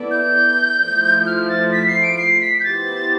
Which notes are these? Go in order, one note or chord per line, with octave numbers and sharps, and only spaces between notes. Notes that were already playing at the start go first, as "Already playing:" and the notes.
Already playing: B3 E4 A4 D5
G6
F3 A3 E4
F6
A6
B6
C7
D7
C7
B6
G6
B3 E4 G4 C5 A6